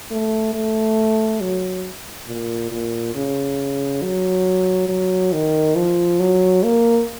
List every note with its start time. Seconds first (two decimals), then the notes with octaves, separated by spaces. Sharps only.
0.11 A3
0.54 A3
1.41 F#3
2.28 A#2
2.71 A#2
3.15 C#3
4.03 F#3
4.89 F#3
5.33 D#3
5.75 F3
6.20 F#3
6.63 A#3